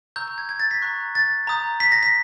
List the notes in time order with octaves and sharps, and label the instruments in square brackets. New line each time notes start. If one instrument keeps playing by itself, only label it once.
[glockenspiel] A#5 C#6 E6 G6
G6
G#6
G#6
A6
B6
A#5 C#6 F#6
A6
A#5 D#6 G6
B6
A#6
B6